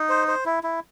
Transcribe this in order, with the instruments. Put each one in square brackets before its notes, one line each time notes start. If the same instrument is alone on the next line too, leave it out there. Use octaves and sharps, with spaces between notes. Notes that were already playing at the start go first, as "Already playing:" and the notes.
Already playing: [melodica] D#4
C5
C5
E4
E4